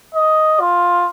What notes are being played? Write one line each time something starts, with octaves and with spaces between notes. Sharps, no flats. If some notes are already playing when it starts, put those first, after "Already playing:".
D#5
F4